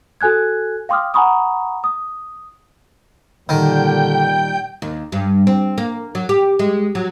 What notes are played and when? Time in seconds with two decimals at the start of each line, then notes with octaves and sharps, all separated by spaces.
0.21 F#4 A4 G#5 F#6 G#6
0.89 F5 G5 C6 D6 D#6 F6
1.14 F#5 G#5 A#5 B5 C#6 D#6
1.84 D#6
3.49 A#2 D3 D#3 G3 G5 G6
4.82 D#2
5.12 G2
5.47 C4
5.78 A#3
6.15 F#3
6.29 G4
6.59 G#3
6.95 F#3